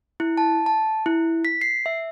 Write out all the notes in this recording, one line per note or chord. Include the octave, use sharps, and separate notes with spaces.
E4
A5
A5
E4
B6
C7
E5